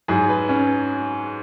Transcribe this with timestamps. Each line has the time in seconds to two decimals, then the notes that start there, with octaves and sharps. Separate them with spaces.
0.08 G#2 F#3 G#4
0.29 B4
0.49 C#4